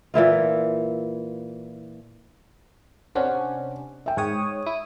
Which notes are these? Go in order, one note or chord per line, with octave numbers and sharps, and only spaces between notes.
A#2 E3 E4 F4
C3 C#4 D4 C5 F#5
E5 G5
G#2 C#5 G5 D#6
E4 D#6